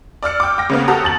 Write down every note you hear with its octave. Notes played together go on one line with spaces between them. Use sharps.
D5 E6 F6 C#7
G5 D6
G5 A#6
C#3 A#3 B3
F#4 G4 A4 F#5 A#5 D#6
D#2 A6 F#7